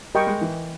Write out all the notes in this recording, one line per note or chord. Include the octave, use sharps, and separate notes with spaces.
G3 A#4 D#5 G5 C#6
G#3
E3